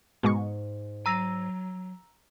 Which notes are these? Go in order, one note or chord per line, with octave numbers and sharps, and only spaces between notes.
G#2 B2 G#3 C#6
F#3 A#5 E6 A#6